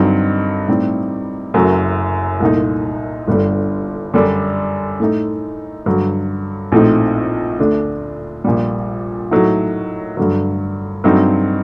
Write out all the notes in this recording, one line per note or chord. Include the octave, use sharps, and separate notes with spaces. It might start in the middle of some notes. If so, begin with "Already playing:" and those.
Already playing: G2 D3 F#3 C4 D#4
A2 G3 C4 D#4
F#1 F#2 F#3 A3
C2 A#2 A3 D#4
G1 G2 D3 G3
F#2 D3 G3 D4
A2 A3 D#4
G2 D3 F#3
A#1 A2 A3 C4 D#4
D2 D3 A3 D4
A#1 A#2 G3
A2 F#3 A3 D#4
G2 D3 F#3
G2 F#3 A3 C4 D#4